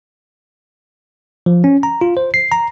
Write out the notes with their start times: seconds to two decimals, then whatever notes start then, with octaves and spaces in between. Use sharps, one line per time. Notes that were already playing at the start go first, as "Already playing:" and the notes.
1.46 F3
1.64 C#4
1.83 A#5
2.01 F4
2.17 C5
2.34 C7
2.52 A#5